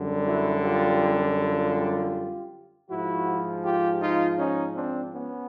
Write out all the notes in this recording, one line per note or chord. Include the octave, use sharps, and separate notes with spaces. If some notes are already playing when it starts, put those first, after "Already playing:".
Already playing: F#2 D3 G3
E4 F#4
F4 G4
F4 G4
G#2 F3 E4 F#4
F4 G4
D#4 F4
C#4 D#4
C4 D4
B3 C#4